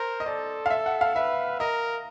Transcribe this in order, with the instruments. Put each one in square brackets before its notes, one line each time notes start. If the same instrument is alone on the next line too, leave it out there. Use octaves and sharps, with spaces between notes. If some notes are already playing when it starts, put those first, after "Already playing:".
Already playing: [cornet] A#4 [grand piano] C5
[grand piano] D#5
[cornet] A4 [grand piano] D5
[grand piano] F5
E5
F#5
F5
[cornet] B4 [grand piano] E5
[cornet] A#4 [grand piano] D#5